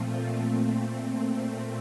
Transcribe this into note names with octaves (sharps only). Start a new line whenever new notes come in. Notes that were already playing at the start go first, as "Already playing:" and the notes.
Already playing: A#2 F3 A3 C4 F4
A#2 A3 C4